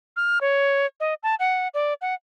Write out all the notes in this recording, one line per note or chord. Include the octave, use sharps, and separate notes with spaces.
F6
C#5
D#5
A5
F#5
D5
F#5